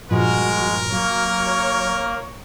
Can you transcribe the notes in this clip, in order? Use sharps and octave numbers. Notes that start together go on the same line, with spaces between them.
G2 A#2 F3 G#3 F#4 A#4
F#3 A#3 C#5